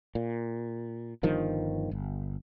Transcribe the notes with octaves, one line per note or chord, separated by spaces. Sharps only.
A#2
G1 G2 D#3 F3
G1